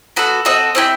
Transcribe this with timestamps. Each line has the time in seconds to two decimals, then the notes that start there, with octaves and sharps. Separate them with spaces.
0.16 B3 F#4 A4
0.45 C4 F#4 A4 D#5
0.75 C4 E4 G4